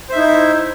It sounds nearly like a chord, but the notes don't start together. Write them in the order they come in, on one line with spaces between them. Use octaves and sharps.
C5 E5 D#4 E4